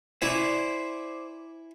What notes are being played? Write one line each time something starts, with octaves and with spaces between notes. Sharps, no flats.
E4 C5 D5 E5 G#5